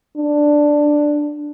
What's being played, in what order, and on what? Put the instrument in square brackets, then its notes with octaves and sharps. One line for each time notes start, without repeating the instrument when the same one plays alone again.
[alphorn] D4